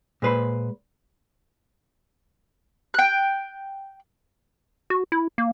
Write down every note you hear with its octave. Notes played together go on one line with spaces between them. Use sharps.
A#2 G#3 B4 C5
G5 F#6
F#4
E4
A#3